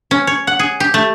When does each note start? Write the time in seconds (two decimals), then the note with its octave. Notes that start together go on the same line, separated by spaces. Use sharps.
0.11 C#4
0.27 C#5
0.47 F#5
0.59 G#4
0.80 G4
0.94 A3